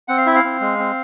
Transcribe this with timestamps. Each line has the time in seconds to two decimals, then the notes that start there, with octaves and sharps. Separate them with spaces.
0.08 C4 F#5
0.18 F5
0.26 E4 E5
0.36 F5
0.44 C4
0.61 G#3
0.79 C4